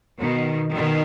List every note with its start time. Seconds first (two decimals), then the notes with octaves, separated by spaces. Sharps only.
0.19 B2 D#3
0.72 B2 D#3